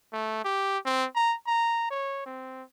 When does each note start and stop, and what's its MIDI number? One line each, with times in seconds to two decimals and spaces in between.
0.13 0.41 57
0.45 0.78 67
0.86 1.06 60
1.16 1.35 82
1.48 1.87 82
1.91 2.26 73
2.26 2.63 60